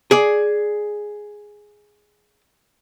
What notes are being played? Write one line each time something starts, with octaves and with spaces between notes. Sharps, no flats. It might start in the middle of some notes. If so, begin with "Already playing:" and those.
G#4 D5